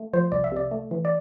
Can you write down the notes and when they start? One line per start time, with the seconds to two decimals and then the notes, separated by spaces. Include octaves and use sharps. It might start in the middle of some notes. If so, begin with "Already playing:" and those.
Already playing: A3
0.13 F3 C5
0.32 C2 D5
0.44 E5
0.52 C3 D5
0.71 A3
0.91 E3
1.05 D5